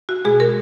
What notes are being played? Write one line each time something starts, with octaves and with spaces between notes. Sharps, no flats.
F#4
B2 G#3 G#4
A#4